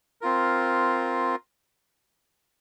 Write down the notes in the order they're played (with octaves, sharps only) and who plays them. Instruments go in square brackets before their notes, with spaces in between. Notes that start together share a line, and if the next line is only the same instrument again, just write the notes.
[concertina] C4 F4 A#4